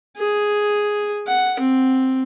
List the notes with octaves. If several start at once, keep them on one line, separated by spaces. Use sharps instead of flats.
G#4
F#5
C4